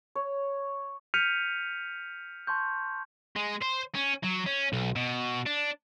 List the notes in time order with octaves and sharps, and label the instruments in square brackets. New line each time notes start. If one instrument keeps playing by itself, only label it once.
[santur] C#5
[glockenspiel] F6 G6 B6 C#7 D#7 F7
A5 C6 C#6 G6
[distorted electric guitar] G#3
C5
C#4
F#3
C#4
B1
B2
D4